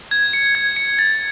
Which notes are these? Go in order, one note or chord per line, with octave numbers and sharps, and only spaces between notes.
G#6
C#7
G#6
C#7
A6